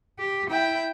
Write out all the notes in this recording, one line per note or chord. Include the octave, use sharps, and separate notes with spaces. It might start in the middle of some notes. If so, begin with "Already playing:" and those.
G4
E4 G5